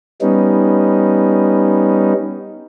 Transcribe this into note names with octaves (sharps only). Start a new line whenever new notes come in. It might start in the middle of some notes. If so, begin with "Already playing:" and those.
G3 B3 C#4 D#4